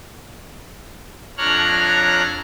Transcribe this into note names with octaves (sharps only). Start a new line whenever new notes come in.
F2 D4 C#5 A#5 F6 F#6